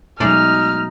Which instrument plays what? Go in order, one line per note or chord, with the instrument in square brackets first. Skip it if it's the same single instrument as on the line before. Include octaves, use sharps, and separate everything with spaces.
[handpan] B2 F#3 [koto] G#3 A3 D5 [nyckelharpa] D#4 [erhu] F6